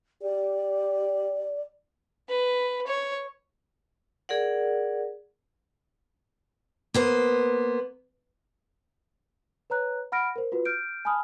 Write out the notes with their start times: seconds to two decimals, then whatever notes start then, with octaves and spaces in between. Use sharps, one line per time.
0.22 G4 D5
2.29 B4
2.87 C#5
4.29 G#4 A#4 D5 F#5
6.94 A#3 B3 C5
9.70 B4 C#5 A#5 F#6
10.12 F#5 B5 F6 A#6 D7
10.36 A#4 C5
10.52 F4 F#4 B4
10.65 F6 G6 D7
11.05 G#5 A5 B5 D#6 F6